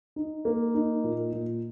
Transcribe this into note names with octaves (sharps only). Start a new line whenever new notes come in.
D#4
A#3
D#4
A#2
A#2